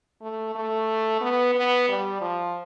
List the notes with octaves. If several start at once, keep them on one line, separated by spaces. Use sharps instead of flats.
A3
A3
B3
B3
G3
F3